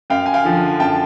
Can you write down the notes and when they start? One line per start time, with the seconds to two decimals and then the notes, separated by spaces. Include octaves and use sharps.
0.10 F#2 F5 G5
0.26 G#5
0.34 F5 G5
0.45 D3 F3
0.80 F#2 G5 A5